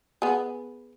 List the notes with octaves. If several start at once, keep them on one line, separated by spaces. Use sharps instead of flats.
B3 G#4